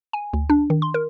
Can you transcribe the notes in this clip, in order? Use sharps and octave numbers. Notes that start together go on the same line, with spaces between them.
G#5
D2
D4
D#3
C6
A#4